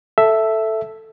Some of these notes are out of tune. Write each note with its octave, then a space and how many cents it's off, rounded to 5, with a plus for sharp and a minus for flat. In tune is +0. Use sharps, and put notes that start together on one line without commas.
A4 +0 E5 +0